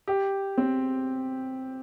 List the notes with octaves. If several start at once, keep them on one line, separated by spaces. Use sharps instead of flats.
G4
C4